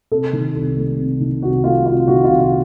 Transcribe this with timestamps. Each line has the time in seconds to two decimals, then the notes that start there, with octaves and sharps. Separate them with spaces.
0.11 C3 A4
0.33 D#3
0.55 C2
0.77 A3
0.99 C3
1.20 D#3
1.42 C2 F#4
1.64 A3 F4
1.86 C3 F4
2.08 D#3 F#4
2.24 F4
2.29 C2
2.40 F4